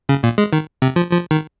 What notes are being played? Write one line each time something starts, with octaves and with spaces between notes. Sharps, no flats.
C#3
A#2
G#3
D#3
C3
F3
F3
D#3